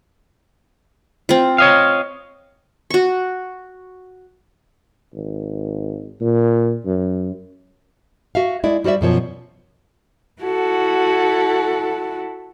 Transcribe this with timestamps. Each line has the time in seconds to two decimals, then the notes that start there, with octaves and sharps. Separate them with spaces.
1.29 C4 F4
1.58 C#5 D#5 F5
2.90 F#4 C#6
5.13 G#1
6.21 A#2
6.85 F#2
8.35 F#4 E5 F5
8.64 G#3 E4 D5
8.84 G3 F#4 C5 D5 E5
9.01 F#2 B2 F3 C#5
10.42 E4 F#4 A4 F#5